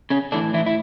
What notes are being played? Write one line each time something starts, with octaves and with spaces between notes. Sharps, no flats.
C#3 C#4
A2 D3 E3 D4
E3 E4
E4